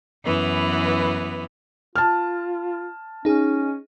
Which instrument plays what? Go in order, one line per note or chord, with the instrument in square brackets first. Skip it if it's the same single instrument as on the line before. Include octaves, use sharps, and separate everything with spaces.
[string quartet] F#2 E3 B3 B4
[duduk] F4 [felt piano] A5 F6
[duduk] C#4 [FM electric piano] D#4 G#4